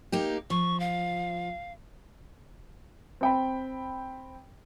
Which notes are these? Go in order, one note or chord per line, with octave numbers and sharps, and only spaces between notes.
A#3 D#4 G4
F3 C#6
F5
C4 G5 B5